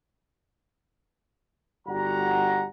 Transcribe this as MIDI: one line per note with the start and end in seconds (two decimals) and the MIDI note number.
1.87 2.65 31
1.87 2.65 55
1.87 2.65 66
1.87 2.65 78
1.87 2.65 82